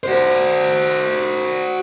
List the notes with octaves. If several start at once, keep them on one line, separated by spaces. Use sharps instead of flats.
F#4 C5